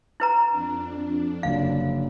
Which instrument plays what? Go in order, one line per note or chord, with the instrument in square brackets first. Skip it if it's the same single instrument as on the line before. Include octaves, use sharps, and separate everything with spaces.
[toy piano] E4 B4 A#5
[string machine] F2 D4
[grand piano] F#1 D3 [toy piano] F5